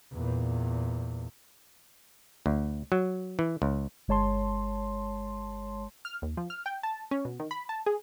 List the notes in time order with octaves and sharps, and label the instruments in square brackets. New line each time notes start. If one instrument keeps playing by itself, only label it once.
[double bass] E2 A#2
[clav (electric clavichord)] D2
F#3
E3
C#2
[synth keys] G1 G#3 C#5 A5 C6
[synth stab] F6
D#2
F3
F6
G5
A5
C#4
B2
D#3
B5
A5
G#4